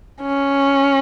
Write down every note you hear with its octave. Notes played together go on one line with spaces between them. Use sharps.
C#4